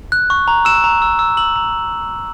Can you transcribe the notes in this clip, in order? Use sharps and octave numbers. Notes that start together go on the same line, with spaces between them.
F#6
C#6
A#5
E6 E7
A#5
E6
E6
E6 F#7
A#5